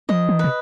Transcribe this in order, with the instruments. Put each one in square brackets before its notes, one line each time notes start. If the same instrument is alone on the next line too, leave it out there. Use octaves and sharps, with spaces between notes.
[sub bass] F3 [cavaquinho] D#5
[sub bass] E3
[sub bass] C3 [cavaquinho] B4